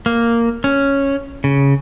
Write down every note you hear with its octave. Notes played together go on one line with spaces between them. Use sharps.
A#3
C#4
C#3